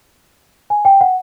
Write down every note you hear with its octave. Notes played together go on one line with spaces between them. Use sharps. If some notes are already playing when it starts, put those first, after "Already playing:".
G#5
G5
F#5